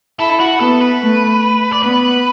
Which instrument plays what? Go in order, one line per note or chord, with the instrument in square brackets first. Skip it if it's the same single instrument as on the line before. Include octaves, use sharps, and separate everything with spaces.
[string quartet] E4 [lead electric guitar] A4
[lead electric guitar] F#4
[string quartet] B3 [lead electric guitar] A4
[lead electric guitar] B4
[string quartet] A3
[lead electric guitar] D5
[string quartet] B3 [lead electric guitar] B4